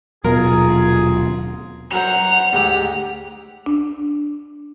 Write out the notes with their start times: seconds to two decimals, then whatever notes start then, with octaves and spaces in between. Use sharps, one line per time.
0.24 D#1 B2 F#3 F4 G#4 A#4
1.92 F#3 A#4 C5 F#5 F7
2.53 D2 G#2 G4 F#5
3.66 D4